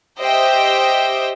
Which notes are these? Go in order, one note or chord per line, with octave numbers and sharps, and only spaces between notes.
G4 C5 D#5 E5 G5